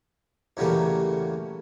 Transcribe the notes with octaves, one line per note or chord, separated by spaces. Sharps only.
E2 C#3 F#3 G3 A3 A#3